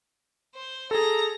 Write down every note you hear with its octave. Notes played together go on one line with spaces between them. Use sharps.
C5
G#4 A4 A#5